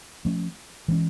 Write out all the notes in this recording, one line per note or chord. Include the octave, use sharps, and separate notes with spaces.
F3 A3 C#4
E3 G#3 C#4